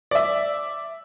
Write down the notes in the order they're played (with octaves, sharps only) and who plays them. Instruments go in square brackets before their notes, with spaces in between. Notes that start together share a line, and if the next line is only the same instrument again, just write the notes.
[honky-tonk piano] D5 E5